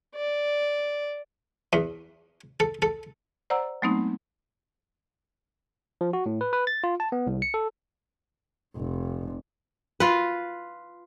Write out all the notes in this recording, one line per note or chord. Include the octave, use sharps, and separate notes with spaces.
D5
E2
A4
A4
C5 D5 F#5 A#5 E6
F#3 G#3 A3 B3 C4 D#4
F3
F#4
A2
B4
B4
A6
F4
A5
B3
C2
C#7
A4
F1
F4 B4